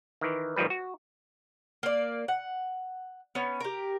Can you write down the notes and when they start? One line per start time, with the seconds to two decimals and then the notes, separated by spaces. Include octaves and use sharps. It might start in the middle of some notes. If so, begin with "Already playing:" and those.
0.21 D#3 E3
0.56 A1 D#3 F3 G3 B4
0.70 F#4
1.83 A#3 D5
2.28 F#5
3.35 B3 C#4
3.60 G4 A#4